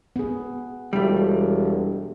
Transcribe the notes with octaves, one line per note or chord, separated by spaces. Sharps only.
B3 G#4
E1 G3 A3